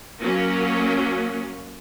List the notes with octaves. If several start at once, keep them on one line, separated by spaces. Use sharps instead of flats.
F#3 A#3 C#4